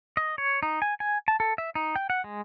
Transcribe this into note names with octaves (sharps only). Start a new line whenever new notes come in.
D#5
C#5
D#4
G#5
G#5
A5
A4
E5
D#4
G5
F#5
G#3